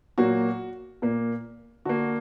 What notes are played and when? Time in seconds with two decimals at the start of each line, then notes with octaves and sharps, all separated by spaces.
0.18 A#2 F#3 A#3 F#4
1.02 A#2 A#3
1.85 D3 A#3 F#4